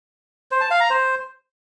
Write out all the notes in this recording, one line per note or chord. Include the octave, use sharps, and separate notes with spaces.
C5
A5
F5
A#5
C5